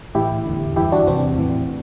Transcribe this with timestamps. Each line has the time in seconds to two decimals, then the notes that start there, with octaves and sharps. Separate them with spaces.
0.15 A2 E3 E4 G4
0.46 E2 D3
0.76 G2 E3 E4 G4
0.92 D4 F#4
1.07 E2 C3 E3 C4
1.38 A2 E3